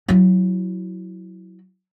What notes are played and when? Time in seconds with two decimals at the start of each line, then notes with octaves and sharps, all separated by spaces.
0.08 F#3 E4